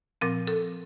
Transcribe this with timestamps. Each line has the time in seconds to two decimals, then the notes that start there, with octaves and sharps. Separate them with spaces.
0.21 A#2 F3 C4 A#4
0.47 A4